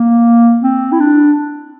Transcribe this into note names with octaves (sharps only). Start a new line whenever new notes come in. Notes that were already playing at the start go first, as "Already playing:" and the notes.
Already playing: A#3
C4
E4
D4